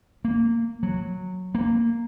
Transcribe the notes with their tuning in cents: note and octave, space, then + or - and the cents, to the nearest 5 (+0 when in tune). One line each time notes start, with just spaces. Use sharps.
A#3 -15
F#3 -10
A#3 -10